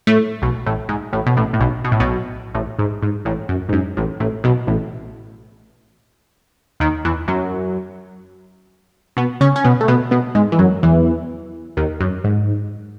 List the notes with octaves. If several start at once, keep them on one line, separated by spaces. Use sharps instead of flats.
A2 A3
B1 B2
A1 A2
G#2
A1 A2
B2
A1 A2
A2
B1 B2
B2
A2
B1 B2
A1 A2
G#2
G#2
A1 A2
F#2
G#2
F#2
A1 A2
A1 A2
B1 B2
A1 A2
D#2 D#3
E2 E3
F#2 F#3
B2 B3
C#3 C#4
C#4
B2 B3
A3
B2 B3
B2 B3
G#2 G#3
E3
F#2 F#3
E2 E3
D#2 D#3
F#2
G#2